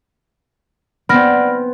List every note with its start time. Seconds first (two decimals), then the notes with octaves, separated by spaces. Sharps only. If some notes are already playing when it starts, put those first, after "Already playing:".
1.09 B3 C4 D5 F#5 B5 F6 A#6